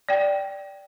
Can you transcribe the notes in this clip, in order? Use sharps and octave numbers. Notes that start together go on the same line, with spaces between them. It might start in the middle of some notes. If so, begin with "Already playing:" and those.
D5 G5